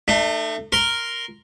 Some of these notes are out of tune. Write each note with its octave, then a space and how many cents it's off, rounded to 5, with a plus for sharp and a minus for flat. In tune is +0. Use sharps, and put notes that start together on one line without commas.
A3 +15 D#4 -45
A#4 +0 C6 +0